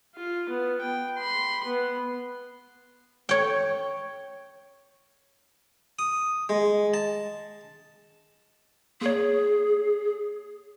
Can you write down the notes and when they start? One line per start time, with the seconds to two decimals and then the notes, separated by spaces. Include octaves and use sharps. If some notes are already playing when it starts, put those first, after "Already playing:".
0.16 F4
0.49 B3
0.81 G5
1.17 B5 C6
1.66 B3
3.29 C#5 G5
5.99 D#6
6.49 G#3
6.94 A5
9.01 A#3 G#4 C#5